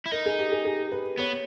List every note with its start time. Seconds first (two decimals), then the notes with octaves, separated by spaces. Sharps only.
0.06 E4
0.12 D#4 A#4
0.26 G#4
0.39 G4
0.52 G#4
0.65 G#4
0.92 B4
1.19 B3 C#5